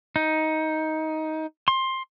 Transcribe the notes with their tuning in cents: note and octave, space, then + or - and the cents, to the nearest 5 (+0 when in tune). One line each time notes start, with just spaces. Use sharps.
D#4 +15
C6 +15